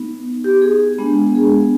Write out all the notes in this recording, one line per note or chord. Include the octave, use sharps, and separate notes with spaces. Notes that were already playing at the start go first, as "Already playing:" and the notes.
Already playing: B3 D#4
G4
G#4
G#3 B3 D4
G#4